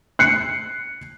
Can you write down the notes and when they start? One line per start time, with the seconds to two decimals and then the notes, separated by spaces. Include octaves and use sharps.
0.19 F#6 C7 C#7